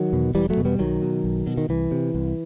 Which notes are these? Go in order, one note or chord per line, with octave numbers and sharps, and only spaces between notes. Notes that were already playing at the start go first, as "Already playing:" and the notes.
Already playing: D#3 F#3
E2 B2
E1 E3 G3
F#3 A3
E2 B2
G3 B3
B1 D#3 F#3
B2
B1
B2
D#3
C2 E3
C3
C2